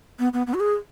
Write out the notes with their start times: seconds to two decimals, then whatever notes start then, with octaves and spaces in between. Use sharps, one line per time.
0.19 B3
0.33 B3
0.47 B3
0.54 F#4
0.60 G#4